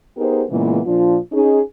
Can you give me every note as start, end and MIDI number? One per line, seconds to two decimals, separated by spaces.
0.17 0.44 59
0.17 0.44 63
0.17 0.44 67
0.17 0.44 68
0.17 0.44 70
0.17 0.44 72
0.50 0.80 46
0.50 0.80 49
0.50 0.80 52
0.50 0.80 56
0.50 0.80 58
0.50 0.80 59
0.86 1.18 46
0.86 1.18 53
0.86 1.18 62
0.86 1.18 65
1.33 1.60 61
1.33 1.60 63
1.33 1.60 68